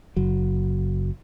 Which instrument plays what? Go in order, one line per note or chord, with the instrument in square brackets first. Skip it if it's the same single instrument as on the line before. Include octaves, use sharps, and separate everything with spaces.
[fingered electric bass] F#1 F#3